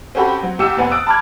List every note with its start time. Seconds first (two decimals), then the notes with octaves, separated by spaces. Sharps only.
0.15 C4 C#4 F#4 G4 A4 B5
0.43 F#3 C4
0.59 C2 G4 D6 E6 C#7 E7
0.77 F1 B3 C4 B4 G#5
0.91 D#6 E6 F#6 A6 D7
1.07 A5 B5 D6 F6 F#6 G#6